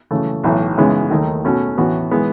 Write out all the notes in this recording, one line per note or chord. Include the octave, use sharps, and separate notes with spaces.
C#3 E3 A3
B1 A2 E3
F#2 C#3 E3 G#3 B3
D#2 D#3 A3 D#4
B2 A3 C#4 F#4
A1 A2 E3 B3 F#4
E3 G#3 B3